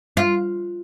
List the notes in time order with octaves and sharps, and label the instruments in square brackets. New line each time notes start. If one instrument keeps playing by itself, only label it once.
[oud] F4